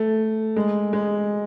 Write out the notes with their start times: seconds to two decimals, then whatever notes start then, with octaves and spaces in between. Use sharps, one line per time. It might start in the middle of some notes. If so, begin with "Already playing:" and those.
Already playing: A3
0.56 G#3
0.93 G#3